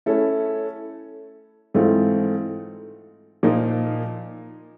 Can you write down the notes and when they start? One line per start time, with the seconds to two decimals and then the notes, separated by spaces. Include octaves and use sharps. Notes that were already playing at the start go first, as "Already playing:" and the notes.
0.06 A3 C#4 E4 A4
1.74 G#2 E3 A3 C4 F4
3.43 A#2 F3 A#3 D#4